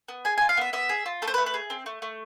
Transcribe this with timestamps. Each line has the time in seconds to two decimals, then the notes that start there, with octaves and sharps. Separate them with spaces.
0.08 B3
0.25 G#4 G#5
0.38 G#5
0.41 F4
0.49 F5
0.57 B3 E5
0.73 B3 E5
0.89 G#4
1.06 F4
1.22 A3 A4
1.28 C5
1.34 B4
1.38 A3
1.46 B4
1.54 G#4
1.70 C4
1.86 A3
2.02 A3